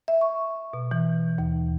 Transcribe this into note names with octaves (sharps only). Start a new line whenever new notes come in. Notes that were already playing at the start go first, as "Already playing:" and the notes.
E5
C#6
B2
E3
D#2